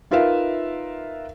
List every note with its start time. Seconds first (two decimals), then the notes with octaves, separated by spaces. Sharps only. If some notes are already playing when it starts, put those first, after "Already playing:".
0.11 D#4 F4 A#4 B4 E5 F5